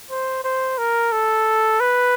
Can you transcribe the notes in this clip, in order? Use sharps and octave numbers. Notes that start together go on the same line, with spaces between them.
C5
C5
A#4
A4
B4